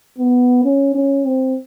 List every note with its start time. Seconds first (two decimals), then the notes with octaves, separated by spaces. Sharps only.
0.19 B3
0.65 C#4
0.95 C#4
1.25 C4